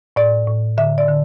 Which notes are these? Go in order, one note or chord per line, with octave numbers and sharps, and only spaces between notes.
A2 D5
A2
D3 E5
D5
D3